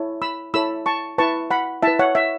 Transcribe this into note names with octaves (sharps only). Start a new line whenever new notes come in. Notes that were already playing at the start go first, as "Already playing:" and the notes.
Already playing: E4 A4 C#5
B5 E6
E4 A4 C#5 B5 E6
A5 C#6
E4 B4 A5 C#6
F#5 B5
E4 B4 E5 A5
C#5 F#5
E5